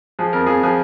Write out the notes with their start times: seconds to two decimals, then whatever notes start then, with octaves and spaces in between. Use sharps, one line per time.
0.19 F3 G#4
0.33 F2 A#4
0.47 F2 G#4
0.63 F3 G#4